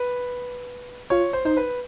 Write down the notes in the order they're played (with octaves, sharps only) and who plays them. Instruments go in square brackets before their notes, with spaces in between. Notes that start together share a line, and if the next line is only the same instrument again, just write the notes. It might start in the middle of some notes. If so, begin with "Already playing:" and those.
Already playing: [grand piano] B4
[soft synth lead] F4 [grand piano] C#5
[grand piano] C5
[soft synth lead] D#4 [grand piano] C5
[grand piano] B4